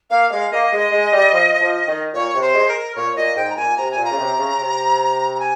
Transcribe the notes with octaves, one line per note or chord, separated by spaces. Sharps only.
A#3 F5
G#3 F5
A#3 D#5
G#3
G#3
G3
F3
F3
D#3
A#2 C#5
C3
C5
G#3
A#4
A#2 C#5
A#2 D#5
G#2 G5
A#5
A#2 G#5
C3 A#5
G#5
A#2
A#5
C#3
C3
C#3
C3
A#5
G#5